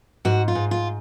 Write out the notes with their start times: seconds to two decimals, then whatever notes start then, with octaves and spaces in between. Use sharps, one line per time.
0.25 G#2 F#4
0.48 F4
0.55 G#2
0.71 F4